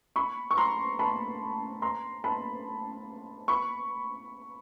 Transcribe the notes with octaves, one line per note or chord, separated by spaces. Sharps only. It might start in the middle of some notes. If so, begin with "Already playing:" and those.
B5 C#6
C#6
A#5 C6
A5 B5
A#5 C6
A5 B5
B5 C#6